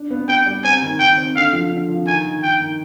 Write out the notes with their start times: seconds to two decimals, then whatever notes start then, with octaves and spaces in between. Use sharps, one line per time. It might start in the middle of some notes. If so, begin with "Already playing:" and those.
Already playing: D4
0.11 B3
0.28 B3 G5
0.46 G3
0.64 C4 G#5
0.82 D#3
0.99 D#3 G5
1.18 C4
1.35 D3 F5
1.53 F3
1.71 D3
1.88 F3
2.06 D#3 G#5
2.24 D#3
2.42 D#3 G5
2.60 D#3